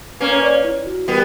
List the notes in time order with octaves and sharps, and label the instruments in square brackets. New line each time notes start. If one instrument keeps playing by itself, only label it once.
[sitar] A#3 C#4 [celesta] B4
[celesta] C#5
B4 D5
C#5
E4
F#4
[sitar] G3 B3 [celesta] A#4